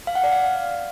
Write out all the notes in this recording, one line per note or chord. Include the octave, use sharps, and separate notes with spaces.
F5
F#5
D5
F5